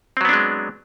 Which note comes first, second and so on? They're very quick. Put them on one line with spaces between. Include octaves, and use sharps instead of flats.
C4 F#3 B3 D4 G#3